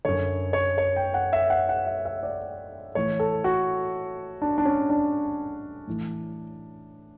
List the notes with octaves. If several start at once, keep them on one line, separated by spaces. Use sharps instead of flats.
F#2 D3 C#5
C#5
C#5
G5
F#5
E5
F#5
F#5
E5
E5
D5
A2 E3 C#5
A4
F#4
D4
D4
C#4
D4
A2 E3